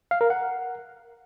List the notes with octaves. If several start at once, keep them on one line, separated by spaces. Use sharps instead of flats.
F5
A#4
F#5